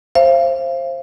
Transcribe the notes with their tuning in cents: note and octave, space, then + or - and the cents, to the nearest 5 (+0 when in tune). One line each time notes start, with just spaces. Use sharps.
C5 +20 F5 -35